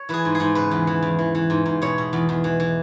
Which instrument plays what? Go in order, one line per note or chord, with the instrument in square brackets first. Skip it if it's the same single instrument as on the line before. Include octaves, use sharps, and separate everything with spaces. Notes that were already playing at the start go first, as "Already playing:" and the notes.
Already playing: [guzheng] C#5
E3 G#4 B4
G#2
G#4
G#2
C#3 B4
E2
E3
E2
E3
E3
G#2
G#2
B2 C#5
B2
E2
E2
E3
E3